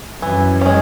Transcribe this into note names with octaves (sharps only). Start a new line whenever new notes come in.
F#2 E3
G#3 C#4